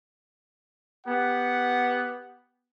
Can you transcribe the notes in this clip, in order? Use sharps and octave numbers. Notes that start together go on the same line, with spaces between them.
B3 G4 F#5